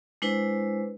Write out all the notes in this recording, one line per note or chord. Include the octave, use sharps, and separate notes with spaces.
G#3 D4 E4 B4 C5